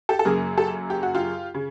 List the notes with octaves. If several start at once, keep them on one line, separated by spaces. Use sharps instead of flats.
G4 A4
A4
F#2 C#3 F#3 A#3 G#4 A#4
G4 A4
G4
F#4
F4 G4
C#3